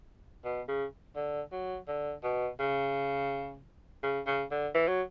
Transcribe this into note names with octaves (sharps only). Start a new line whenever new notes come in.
B2
C#3
D3
F#3
D3
B2
C#3
C#3
C#3
D3
E3
F#3